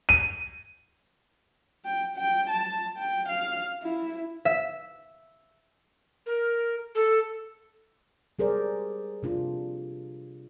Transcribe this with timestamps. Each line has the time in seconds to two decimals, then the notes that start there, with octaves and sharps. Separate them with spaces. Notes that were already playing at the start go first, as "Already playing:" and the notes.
0.09 D#7
1.85 G5
2.16 G5
2.50 A5
2.97 G5
3.28 F5
3.82 E4
4.45 E5
6.26 A#4
6.95 A4
8.39 G3 G#4 A#4 C5 D5
9.23 C3 D4 F4